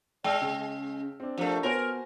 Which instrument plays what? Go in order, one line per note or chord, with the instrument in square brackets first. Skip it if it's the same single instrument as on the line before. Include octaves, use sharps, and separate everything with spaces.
[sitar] G#3 [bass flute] D5 [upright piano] G5 E6 F6
[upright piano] C#3 G5 [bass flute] C#4
[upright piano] C4 D4
[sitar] F3 A3 [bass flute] D4 [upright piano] G4 A#4 D5
[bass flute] B3 [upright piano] F#4 C5 G#5 [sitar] A#4